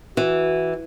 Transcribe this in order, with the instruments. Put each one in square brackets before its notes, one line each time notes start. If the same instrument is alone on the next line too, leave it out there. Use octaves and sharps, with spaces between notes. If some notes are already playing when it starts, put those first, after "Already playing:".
[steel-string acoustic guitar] E3 [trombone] F#4